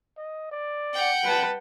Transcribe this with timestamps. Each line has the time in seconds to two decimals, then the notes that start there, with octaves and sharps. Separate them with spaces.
0.17 D#5
0.52 D5
0.94 F#5 G5
1.24 G3 B4 A5